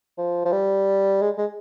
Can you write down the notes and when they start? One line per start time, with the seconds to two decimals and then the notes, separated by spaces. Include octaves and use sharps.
0.18 F3
0.45 F3
0.53 G3
1.22 G#3
1.38 G#3